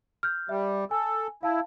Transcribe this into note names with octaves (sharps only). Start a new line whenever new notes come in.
F6 G6
G3 E5
A4 G#5
E4 F5 A5